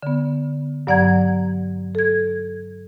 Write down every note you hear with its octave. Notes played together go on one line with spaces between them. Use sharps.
D3 B3
G2 F#3 D5 F#5 A#5 G#6
A4 G#6